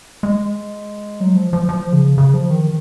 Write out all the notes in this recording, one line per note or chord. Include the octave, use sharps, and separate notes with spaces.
G#3
F#3
F3
F3
F3
C#3
C#3
F3
D#3